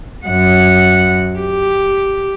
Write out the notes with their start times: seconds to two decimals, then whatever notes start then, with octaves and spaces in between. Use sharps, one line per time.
0.26 F#2 F#5
1.39 G4